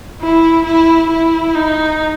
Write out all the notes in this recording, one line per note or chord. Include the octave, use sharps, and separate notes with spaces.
E4
E4
E4
D#4